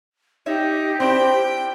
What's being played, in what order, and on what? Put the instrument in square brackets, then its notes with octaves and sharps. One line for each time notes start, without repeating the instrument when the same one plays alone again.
[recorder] D#4 [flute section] G4 [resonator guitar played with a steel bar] C#5 E5
[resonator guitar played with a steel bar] C4 D4 E4 [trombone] C5 [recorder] G5